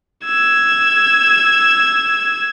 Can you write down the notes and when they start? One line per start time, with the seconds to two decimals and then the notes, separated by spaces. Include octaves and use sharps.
0.25 E6 G#6